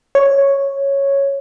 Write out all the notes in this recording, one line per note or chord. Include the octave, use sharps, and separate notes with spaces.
C#5